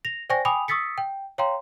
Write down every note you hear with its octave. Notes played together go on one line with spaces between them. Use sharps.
A#6 F7
C5 D5 G5 G#5 C#6 A#6
G5 G#5 B5 D6 D#6 F7
C#6 D#6 E6 A6 B6 C#7
G5
C#5 F5 G5 A#5 C6